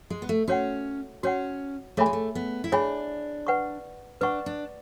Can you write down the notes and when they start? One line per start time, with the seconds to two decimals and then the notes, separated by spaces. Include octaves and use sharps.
0.10 G#3
0.22 B3
0.29 A3
0.48 C#4 F#4 C#5 F#5
1.23 C#4 F#4 C#5 F#5
1.97 A3 G#4 C#5 E5 G#5 B5
2.06 G#3
2.13 A3
2.35 B3
2.64 E4
2.72 D4 G#4 C#5 E5 G#5 B5
3.47 B4 F#5 C#6
4.21 D4 B4 F#5 C#6
4.46 D4